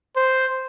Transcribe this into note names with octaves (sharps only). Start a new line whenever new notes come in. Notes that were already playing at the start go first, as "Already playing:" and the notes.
C5